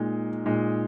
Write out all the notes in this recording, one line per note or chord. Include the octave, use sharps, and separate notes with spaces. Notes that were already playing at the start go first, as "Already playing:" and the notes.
Already playing: A#2 G#3 D#4
A#2 G#3 D#4